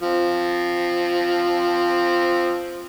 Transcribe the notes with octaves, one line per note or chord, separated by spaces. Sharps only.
F3 C4